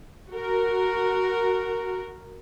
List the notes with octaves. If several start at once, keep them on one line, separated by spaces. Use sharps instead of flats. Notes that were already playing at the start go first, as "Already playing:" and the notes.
F#4 A#4